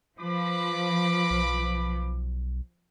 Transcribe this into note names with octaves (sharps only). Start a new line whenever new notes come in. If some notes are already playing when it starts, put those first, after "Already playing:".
F3 B4 B5 D6
B1